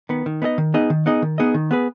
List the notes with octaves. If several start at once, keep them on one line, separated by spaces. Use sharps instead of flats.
D#3 B3
D#3
B3 D#4 G#4 D#5
D#3
B3 D#4 G#4 D#5
D#3
B3 D#4 G#4 D#5
D#3
B3 D#4 G#4 D#5
D#3
B3 G#4 B4